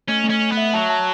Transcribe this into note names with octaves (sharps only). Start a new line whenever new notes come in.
A3 C#4
A3
C#4
A3
B3
E5
F#3 A5
A5